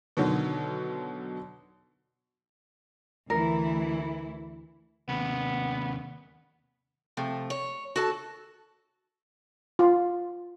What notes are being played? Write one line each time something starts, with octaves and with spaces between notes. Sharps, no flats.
B2 D3 D#3 F#3
D2 E3 E4 A#4
D#2 C3 B3
C3 F3 A3
C#5
F#4 A4 A5
F4